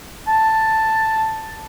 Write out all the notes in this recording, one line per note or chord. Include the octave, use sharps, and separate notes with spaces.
A5